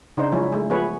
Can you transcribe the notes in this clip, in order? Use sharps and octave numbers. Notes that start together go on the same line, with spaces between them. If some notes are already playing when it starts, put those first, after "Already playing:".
C#3 D4 D#4 C5
F3 F#3 G#3 C#4 E4
G#3 A3
F3 A3 B3 G#4 B4 C#5